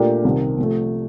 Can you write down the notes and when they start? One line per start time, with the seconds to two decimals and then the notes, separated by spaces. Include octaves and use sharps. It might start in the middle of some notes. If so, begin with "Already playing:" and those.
Already playing: A#2 A3 D4 G4 A#4
0.24 C2 C3 D#3
0.58 C3 F3 A3